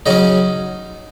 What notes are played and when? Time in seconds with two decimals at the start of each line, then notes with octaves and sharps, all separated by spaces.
0.06 C#3 F#3 C#4 D#4 D#5